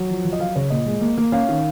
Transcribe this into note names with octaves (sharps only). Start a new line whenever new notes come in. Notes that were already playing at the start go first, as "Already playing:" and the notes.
Already playing: F#3
F3
F3
D#5
F#3 F5
C#3 C#5
A#2 D#5
G#3
A#3
A#3
C#4 F5
D#3